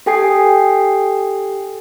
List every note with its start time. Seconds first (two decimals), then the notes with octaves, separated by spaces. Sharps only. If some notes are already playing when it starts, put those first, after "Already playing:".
0.06 G4 A4 G5 G#5 D#6 C7